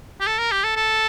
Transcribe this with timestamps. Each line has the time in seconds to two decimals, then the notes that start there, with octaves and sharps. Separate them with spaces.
0.21 G4
0.27 A4
0.39 A#4
0.52 G4
0.64 A4
0.76 A4